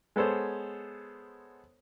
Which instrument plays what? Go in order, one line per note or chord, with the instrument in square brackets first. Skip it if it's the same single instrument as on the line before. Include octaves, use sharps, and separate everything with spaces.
[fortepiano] G#3 B3 A4 C5 C#5